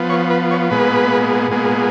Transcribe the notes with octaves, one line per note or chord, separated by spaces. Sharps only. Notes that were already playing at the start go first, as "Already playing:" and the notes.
Already playing: F3 B3
C#5
B4
C#5
A#2 G#3 B3 B4
A#2 G#3 B3